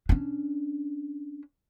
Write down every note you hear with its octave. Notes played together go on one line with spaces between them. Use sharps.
C#4 D4